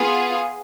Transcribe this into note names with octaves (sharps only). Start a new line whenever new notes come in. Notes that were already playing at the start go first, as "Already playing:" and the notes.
Already playing: B3 F4 G#4